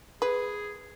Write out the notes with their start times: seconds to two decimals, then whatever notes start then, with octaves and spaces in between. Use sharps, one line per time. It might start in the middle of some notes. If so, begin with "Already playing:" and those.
0.22 G#4 B4